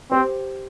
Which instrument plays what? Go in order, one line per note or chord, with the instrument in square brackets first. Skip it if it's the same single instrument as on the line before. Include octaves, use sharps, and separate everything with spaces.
[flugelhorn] C4 [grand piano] G4 C5